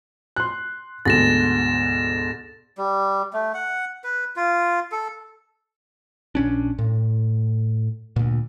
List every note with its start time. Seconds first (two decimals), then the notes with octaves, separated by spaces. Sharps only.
0.36 C6 F#6
1.05 D2 G#2 B2 A6 A#6 E7
2.78 G3
3.33 A3
3.54 F#5
4.04 B4
4.36 F4
4.92 A4
6.35 A#1 C#4 D4
6.78 A2
8.16 D2 A#2